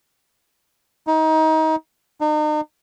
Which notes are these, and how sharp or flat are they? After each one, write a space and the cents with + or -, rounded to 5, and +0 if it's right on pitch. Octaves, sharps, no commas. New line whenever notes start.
D#4 +25
D#4 -40